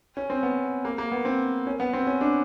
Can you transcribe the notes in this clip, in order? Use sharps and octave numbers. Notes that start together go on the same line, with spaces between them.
C#4
C4
B3
A#3
A#3
B3
C4
C#4
B3
C4
C#4
D4